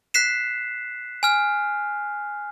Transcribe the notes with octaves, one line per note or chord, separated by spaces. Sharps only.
F#6 B6 C7 E7
G#5 F6